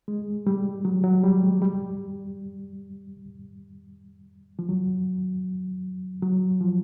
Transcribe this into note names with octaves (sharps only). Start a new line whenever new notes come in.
G#3
G3
F#3
F#3
G3
G#3
G3
F3
F#3
F#3
F3